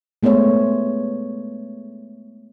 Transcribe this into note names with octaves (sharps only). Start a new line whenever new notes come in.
G#3 A3 B3 C5 C#5